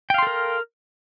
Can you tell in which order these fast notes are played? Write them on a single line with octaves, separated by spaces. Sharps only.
G5 F5 C6 A4 A#4